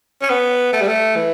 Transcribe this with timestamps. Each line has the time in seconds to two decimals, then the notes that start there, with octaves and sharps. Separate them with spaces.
0.22 C#4
0.30 B3
0.73 A3
0.81 G3
0.88 A3
1.16 E3